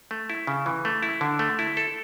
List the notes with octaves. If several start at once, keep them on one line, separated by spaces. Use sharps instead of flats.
A3
E4
C#3
E3
A3
E4
D3
A3
E4
A4